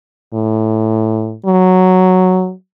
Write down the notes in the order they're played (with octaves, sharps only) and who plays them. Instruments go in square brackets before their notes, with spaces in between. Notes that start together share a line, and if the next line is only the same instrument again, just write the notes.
[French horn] A2
F#3